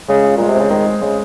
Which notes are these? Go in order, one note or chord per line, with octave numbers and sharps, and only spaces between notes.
C#3 G#3
F4
A#2 G#3
C3
C#3 C4
D#3 G#3
G#4
C#3 G#3